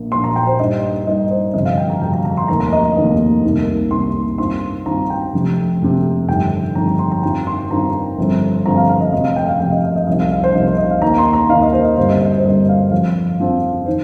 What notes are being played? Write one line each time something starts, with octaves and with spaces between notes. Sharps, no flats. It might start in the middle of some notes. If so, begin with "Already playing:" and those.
Already playing: A#1 A#2 A#3
A#1 A#2 A#3 C6
A#5
G5
C5
G2 G3 D#4 D#5
G2 G3 D#4 D#5
C5
G1 F2 C3 D#5
F5
G5
A#5
G1 F2 C3 G5
A#5
A#5
C6
F1 D#2 D#3 A#3 D#4 A#5
A#5
D#5
F1 D#2 D#3 A#3 D#4
C2 C3 D#3 A#3
C2 C3 D#3 A#3 C6
G2 D#3 C4 F4 C6
G2 D#3 C4 F4 A#5
G5
F1 F2 C3
F1 F2 C3
G1 F2 D#3 G3 G5
G1 F2 D#3 G3 A#5
A#5
C6
A#5
G2 D#3 C4 F4 G5
C6
G2 D#3 C4 F4 A#5
G1 G2 F3 C4 F4
G1 G2 F3 C4 F4 A#5
F5
F5
D#5
F1 F2 C3 D#5
F5
G5
F5
F1 F2 C3 G5
D#5
D#5
D#5
C2 C3 F3 C4 D#4 D#5
F5
F5
C5
C2 C3 F3 C4 D#4 D#5
C5
D#5
F5
D#2 D#3 A#3 D#4 A#5
C6
A#5
D#2 D#3 A#3 D#4 F5
D#5
C5
D#5
G1 G2 G3 C4 C5
D#5
D#5
C5
G1 G2 G3 C4 D#5
F5
F2 F3 C4 F4 F5
F2 F3 C4 F4
D#3 C5